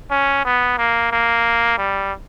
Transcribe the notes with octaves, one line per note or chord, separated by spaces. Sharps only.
C#4
B3
A#3
A#3
G3